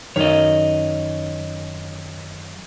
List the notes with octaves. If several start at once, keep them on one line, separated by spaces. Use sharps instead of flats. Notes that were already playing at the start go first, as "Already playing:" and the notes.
F#2 D#3 C#5 D#5